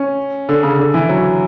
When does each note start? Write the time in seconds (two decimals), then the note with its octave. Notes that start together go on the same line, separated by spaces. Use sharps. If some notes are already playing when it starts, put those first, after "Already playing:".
Already playing: C#4
0.49 D3
0.63 C#3
0.79 D3
0.94 E3
1.09 F#3